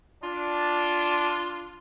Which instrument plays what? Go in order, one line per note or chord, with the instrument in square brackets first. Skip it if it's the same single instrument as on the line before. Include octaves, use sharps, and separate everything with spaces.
[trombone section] D4 [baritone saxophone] F4